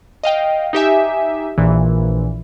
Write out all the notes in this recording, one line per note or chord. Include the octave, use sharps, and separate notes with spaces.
D#5 F5 G5
D#4 G4 E5 G#5
A#1 A#2 E3